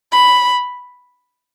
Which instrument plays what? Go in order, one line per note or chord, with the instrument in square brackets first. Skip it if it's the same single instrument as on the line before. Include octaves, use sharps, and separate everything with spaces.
[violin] B5